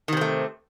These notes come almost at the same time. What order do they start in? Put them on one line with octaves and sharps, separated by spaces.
D#3 C3 C4 A3